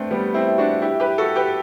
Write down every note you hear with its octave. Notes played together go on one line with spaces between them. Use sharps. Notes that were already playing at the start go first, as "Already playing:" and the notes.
Already playing: A3 B3 C4 D4
G3 B3
C4 E4
D4 F#4
E4 G4
G4 B4
F#4 A4
G4 B4